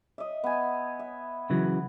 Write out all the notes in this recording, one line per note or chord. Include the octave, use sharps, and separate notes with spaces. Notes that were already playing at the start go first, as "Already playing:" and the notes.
D#5 E5
B3 G#5
E5
C#3 E3 F#3